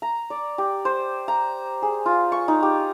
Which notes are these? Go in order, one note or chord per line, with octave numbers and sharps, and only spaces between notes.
A#5
D5
G4
C5
A#5
G#4
F4
C#6
D#4
G4